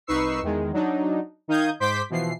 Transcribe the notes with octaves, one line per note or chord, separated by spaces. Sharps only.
C2 D#4 B4 C#6 E6 C7
E2 D#3 G#3
F#3 D4 D#4
D#3 D#4 F5 D#6 G6 G#6
G#2 C5 C6 D6 G6 B6
B2 E3 F3 C7